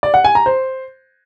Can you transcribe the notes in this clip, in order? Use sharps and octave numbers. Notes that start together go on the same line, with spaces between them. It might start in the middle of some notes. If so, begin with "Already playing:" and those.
D5
F#5
G#5
A#5
C5